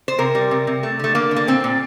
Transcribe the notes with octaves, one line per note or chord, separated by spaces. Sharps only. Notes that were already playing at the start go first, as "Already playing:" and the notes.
C5
C3 A#4
G3
C3
C3
A3
D3 A3
D3 A#3
D3
A#3
A#2 C4
A#2